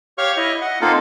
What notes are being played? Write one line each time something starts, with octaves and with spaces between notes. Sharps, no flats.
G4 C#5 F5 C#6 F6
E4 D#5
D#5 F#5
A#3 C4 D#4 F4 A4 F5